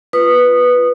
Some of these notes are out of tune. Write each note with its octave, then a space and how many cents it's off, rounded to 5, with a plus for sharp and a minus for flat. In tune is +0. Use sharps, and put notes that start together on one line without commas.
F4 -20 B4 +0 D#6 -15